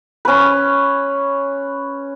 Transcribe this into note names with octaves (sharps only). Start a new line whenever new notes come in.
C#4 B4